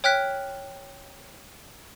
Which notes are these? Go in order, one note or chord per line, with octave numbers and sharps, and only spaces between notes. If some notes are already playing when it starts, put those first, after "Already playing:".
C#5 G5 F6 F#6 B6